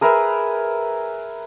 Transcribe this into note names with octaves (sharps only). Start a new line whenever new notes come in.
G#4 A#4 B4 E5